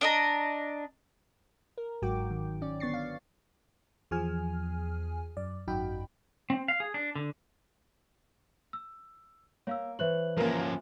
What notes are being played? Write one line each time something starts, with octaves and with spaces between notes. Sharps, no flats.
D4 D#5 A#5
A#4
G1 G#2 F#3 F#4 G5 D6
D#3
C#4 D5
D3 B3 C#6 A6 C7
F5
E2 F3 G#4 G#5 F6
F#2 D5
G#1 F#2 D#4 F#4 G5 B5
C4
F5
G#4
D4
D3
E6
A#3 C#5 F5 E6
E3 C5 C#5 E5 F#6 F#7
F3 A#3 C#4 A#4